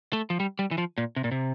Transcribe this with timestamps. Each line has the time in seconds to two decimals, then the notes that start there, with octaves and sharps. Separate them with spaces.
0.13 A3
0.30 F3
0.40 G3
0.59 G3
0.71 E3
0.78 F3
0.98 A#2
1.16 C3
1.24 A#2
1.31 C3